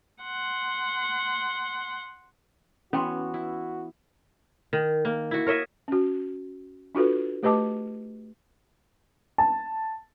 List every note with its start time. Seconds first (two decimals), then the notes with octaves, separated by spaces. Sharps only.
0.23 F#5 C6
2.93 E3 B3 C#4 F#4 C#5 G5 C6
3.34 E4
4.73 D#3
5.05 A#3
5.31 E4 F#4
5.46 A#4 C#5 D#5 E5
5.88 C#4 F#4
6.95 D4 F4 F#4 A4 B4
7.43 A3 G4 B4 D#5 A5 D6
9.38 A5